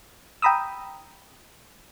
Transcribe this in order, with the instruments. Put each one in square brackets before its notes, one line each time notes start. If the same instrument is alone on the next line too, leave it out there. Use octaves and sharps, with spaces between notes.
[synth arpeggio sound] G5 A#5 B5 D#6 E6